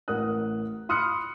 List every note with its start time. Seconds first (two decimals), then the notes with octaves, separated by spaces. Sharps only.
0.08 A1 A#4 F#5 D#6 F#6
0.89 B5 C6 D#6 F6 F#6 C#7